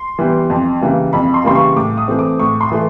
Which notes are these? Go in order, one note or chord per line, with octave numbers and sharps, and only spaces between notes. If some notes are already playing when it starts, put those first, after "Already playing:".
Already playing: C6
E3 G3 B3
F2
C#3 E3 G3 A#3
F2 B5
C6
C#3 E3 G3 A#3 C6
C#6
A2 D6
D#6
E3 A3 C4
D6
A2 C#6
C6
E3 A3